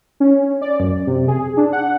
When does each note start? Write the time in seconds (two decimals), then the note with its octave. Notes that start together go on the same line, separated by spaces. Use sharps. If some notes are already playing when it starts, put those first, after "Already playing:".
0.20 C#4
0.62 D5
0.80 F#2
1.07 C3
1.28 G#4
1.57 D4
1.73 F#5